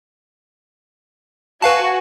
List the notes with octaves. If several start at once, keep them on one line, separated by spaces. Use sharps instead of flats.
F#4 B4 F5 G#5 A5